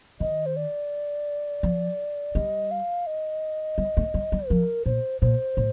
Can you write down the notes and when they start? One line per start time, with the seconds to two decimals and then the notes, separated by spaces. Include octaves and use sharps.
0.20 D#3 D#5
0.46 C5
0.56 D5
1.63 F3
2.35 G3 D#5
2.71 F5
3.07 D#5
3.78 G3
3.97 A3
4.14 G3
4.32 G3
4.50 F3 A#4
4.86 A#2 C5
5.21 A#2 C5
5.57 A2